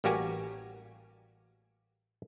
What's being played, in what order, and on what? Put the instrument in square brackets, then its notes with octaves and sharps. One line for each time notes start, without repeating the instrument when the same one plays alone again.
[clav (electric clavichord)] A1 G3 A#3 F#4 G4 G#5